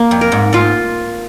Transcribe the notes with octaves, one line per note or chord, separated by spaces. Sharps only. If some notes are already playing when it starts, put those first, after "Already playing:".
Already playing: A#3
F2
A#4
G#2
G#2 F4